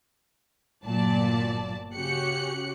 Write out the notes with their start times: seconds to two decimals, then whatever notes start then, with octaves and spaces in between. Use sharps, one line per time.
0.85 G1 A#2 F#3 D5 A5
1.94 C#3 C#4 F#4 G4 F#6 C#7